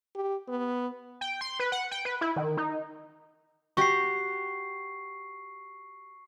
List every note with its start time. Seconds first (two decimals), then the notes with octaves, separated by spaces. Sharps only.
0.15 G4
0.49 B3
1.21 G5
1.41 C6
1.60 B4
1.72 F#5
1.91 G5
2.05 B4
2.21 E4
2.36 D#3
2.57 D#4
3.77 F#4 G4 C#6 C7